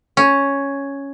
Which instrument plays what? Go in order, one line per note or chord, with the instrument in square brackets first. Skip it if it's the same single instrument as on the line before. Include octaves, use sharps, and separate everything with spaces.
[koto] C#4